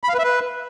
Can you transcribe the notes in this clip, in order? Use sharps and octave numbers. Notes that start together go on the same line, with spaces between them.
B5
F5
B4
E5
B4